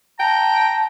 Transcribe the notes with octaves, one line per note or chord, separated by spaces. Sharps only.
G5 A5 A#5